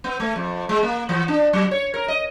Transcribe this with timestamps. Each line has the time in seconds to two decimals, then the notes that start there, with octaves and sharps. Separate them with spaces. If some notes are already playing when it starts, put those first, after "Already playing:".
0.04 B3
0.20 A3
0.36 F2
0.69 G#3
0.83 A#3
1.09 E3
1.28 D4
1.53 F#3
1.71 C#5
1.94 A#4
2.08 D#5